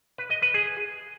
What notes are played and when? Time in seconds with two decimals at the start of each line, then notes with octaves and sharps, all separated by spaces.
0.18 B4
0.30 D#5
0.42 B4
0.54 G#4